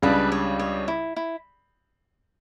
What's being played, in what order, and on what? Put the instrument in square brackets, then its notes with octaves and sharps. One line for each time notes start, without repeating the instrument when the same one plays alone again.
[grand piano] C#2 C#3 G3 D4 [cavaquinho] B4
[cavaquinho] C#5
C#5
E4
E4